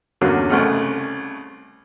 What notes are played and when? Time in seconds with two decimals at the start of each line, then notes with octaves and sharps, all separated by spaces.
0.21 E2 G2 D3 F#3 A#3 C#4
0.50 C2 C#3 A3 G#4 F#5 F6